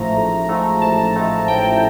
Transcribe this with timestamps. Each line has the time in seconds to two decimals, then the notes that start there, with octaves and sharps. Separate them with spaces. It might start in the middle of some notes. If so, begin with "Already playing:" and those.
Already playing: A1 G#2 F3 A3 A#5
0.16 A1
0.49 G#2 F3 A3
0.81 A1 A5
1.16 G#2 F3 A3
1.48 A1 G5